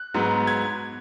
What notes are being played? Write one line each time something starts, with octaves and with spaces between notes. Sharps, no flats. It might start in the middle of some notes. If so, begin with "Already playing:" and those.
Already playing: F#6
G#2 F#3 B3
G#6